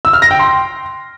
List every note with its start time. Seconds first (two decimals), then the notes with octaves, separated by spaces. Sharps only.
0.05 E6
0.13 F6
0.22 A#6
0.31 G5
0.39 C6